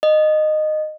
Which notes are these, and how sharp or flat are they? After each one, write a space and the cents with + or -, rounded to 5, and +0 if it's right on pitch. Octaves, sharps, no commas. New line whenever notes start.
D#5 -15